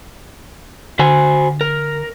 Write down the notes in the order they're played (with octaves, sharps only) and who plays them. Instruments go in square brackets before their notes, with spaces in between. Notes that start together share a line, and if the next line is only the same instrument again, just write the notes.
[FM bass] D3 [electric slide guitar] F#4 C5 G#5
[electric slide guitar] A#4